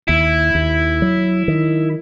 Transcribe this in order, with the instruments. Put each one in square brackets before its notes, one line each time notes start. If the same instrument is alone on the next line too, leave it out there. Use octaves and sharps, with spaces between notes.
[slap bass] D#2 [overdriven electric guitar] E4
[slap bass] D#2
F#3
D#3